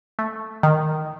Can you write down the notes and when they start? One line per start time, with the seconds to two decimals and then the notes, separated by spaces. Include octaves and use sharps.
0.19 A3
0.63 D#3